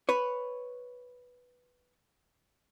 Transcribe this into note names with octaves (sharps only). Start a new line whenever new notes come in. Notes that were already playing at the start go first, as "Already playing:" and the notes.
B4 C#5